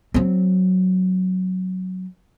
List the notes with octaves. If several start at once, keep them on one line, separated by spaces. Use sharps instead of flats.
F#3 C4